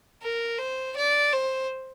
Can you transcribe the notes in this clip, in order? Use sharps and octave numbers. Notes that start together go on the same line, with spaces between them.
A#4
C5
D5
C5